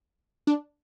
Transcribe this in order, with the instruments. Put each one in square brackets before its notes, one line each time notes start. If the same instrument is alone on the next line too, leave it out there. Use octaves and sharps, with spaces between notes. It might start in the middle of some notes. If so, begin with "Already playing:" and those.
[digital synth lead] D4